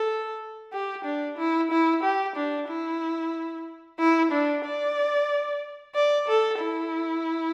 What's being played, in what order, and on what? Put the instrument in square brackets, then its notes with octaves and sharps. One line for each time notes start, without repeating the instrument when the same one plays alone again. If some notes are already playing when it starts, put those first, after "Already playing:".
Already playing: [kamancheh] A4
G4
D4
E4
E4
G4
D4
E4
E4
D4
D5
D5
A4
E4